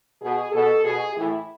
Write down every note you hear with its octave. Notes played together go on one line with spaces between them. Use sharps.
B2 G#4
B2 A4
B2 G#4
A2 E3 E4